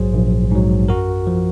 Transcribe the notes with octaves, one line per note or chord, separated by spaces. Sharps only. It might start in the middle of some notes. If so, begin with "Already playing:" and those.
Already playing: A#1 G#2 F#3 G#4 C5
A#1
G#2 F#3
F#2 F#4 A#4
F3